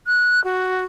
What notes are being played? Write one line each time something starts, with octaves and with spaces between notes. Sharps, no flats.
F#6
F#4